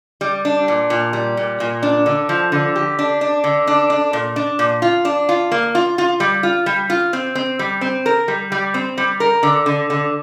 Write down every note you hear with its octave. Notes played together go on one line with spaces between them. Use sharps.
G3
D4
A#2
A#2
G3
A#2
A#2
D4
D3
F3
D3
G4
D4
D4
D3
D4
D4
A#2
D4
A#2
F4
D4
F4
A#3
F4
F4
G3
F4
G3
F4
C4
C4
G3
C4
A#4
G3
G3
C4
G3
A#4
D3
D3
D3